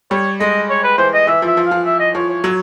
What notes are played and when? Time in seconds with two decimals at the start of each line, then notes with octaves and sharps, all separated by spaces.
0.11 G3 C#5
0.40 G#3 D#5
0.69 C#5
0.84 B4
0.98 E3 C5
1.13 D#5
1.27 E3 E5
1.42 F3 E5
1.57 F3
1.66 F5
1.71 F3
1.86 E5
2.00 D#5
2.15 F3 C#5
2.30 C#5
2.44 F#3